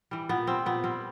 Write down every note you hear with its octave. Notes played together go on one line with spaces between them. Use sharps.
E3 G3
A#2 B3
G3 C4
A#2 B3
G3 C4